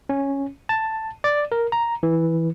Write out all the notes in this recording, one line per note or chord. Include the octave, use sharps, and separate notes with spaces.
C#4
A5
D5
A#4
A#5
E3